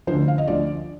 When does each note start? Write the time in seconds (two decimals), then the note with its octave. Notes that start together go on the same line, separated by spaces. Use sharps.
0.07 D2 D3 F3 C5
0.28 F5
0.38 D#5
0.47 D2 D3 F3 D5